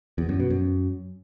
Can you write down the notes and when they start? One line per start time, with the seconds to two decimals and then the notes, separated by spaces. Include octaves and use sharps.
0.18 E2
0.29 F#2
0.40 B2
0.50 F#2